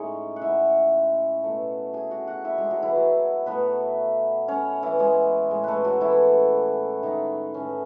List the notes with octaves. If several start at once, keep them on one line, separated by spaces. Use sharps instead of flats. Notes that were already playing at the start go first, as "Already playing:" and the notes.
Already playing: A2 G#3 C#4 D#4 C#5 D#5
F#5
E4 E5
B2 F#3 A3
G#4 G#5
F#4 F#5
F#4 F#5
E4 E5
G#3 G#4
F#3 F#4
E3 E4
F#3 F#4
A2 F#3 A3 B3 B4
C#4 C#5
E3 E4
G#3 G#4
A2 G#3
A3 A4 B4
F#3 F#4
E3 E4
D#3 D#4
A2 E3 A3 C#4